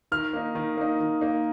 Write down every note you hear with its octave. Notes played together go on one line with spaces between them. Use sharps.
D#3 F6
A#3 D#4
D#3
A#3 D#4
D#3
A#3 D#4